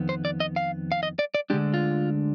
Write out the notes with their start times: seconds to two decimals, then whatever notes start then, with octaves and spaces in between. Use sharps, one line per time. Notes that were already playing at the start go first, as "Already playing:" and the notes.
Already playing: F2 D#3 B3
0.09 C5
0.25 D5
0.40 D#5
0.56 F5
0.92 F5
1.03 D#5
1.19 D5
1.35 D5
1.50 D2 D3 G#3 D4 G4
1.74 F4